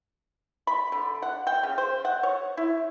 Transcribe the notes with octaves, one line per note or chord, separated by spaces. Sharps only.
B5
D3
F#5
G5
C#3
C5
F#5
C#5
E4